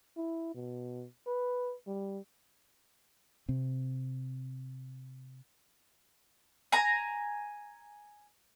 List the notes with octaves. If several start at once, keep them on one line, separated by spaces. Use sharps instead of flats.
E4
B2
B4
G3
C3 C4
G#5 A#5